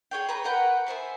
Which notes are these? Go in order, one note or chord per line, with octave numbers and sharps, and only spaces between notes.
G#4 C#5 G5
B4 A#5
A#4 B4 F#5 G5
B3 C5 E5 G#5